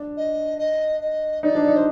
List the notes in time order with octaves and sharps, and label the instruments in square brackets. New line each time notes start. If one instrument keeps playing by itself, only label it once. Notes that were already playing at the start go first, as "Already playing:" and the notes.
Already playing: [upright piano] D4
[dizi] D#5
D#5
D#5
[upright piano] D#4 [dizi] D5
[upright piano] D4
D#4
[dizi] C5